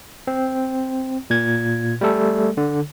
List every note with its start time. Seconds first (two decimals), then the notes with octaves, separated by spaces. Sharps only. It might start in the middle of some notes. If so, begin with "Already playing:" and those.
0.27 C4
1.30 A#2 G#6
2.01 G3 A3 A4
2.57 D3